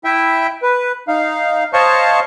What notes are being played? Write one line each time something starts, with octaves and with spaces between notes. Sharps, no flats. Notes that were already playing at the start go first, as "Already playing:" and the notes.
E4 E5 G5
B4
D#4 F5
C5 C#5 D#5 F5 A5 C#6